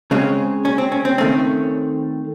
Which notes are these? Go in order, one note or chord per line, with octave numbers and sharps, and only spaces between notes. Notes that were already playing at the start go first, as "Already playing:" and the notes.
C#3 G#3 C4 C#4
C#4
C4
C#4
C4
D#3 A3 C4 C#4